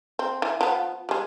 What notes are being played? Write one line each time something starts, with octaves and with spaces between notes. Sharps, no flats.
C4
E3
F3 B3
G3 G#3